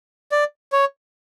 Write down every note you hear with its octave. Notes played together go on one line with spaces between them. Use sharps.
D5
C#5